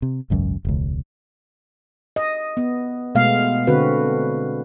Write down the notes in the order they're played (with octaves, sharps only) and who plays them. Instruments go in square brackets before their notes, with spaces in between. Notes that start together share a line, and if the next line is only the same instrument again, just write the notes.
[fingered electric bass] C3
G#1 C#2 F#2
E1 C#2
[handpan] D#5
B3
B2 G#3 A3 B3 F5
D3 C4 F#4 B4